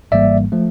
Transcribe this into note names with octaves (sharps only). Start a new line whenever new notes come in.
G#1 G#2 E3 G3 A#3 D5 E5
F3 A3